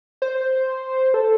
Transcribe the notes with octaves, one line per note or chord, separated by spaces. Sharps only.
C5
A4